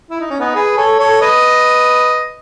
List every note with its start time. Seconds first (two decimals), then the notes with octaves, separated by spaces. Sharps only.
0.11 E4
0.20 D#4
0.30 C#4
0.40 B3 D#4
0.55 G#4 B4
0.77 A4 C#5
0.99 A4 C#5
1.21 B4 D#5